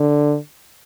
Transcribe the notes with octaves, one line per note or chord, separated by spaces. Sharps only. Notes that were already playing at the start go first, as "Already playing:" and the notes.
Already playing: D3